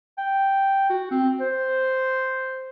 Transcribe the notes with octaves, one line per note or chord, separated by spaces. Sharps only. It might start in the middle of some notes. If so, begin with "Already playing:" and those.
G5
F#4
C4
C5